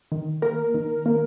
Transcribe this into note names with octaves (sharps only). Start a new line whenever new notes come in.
D#3
A#3 A#4
D#3
A#3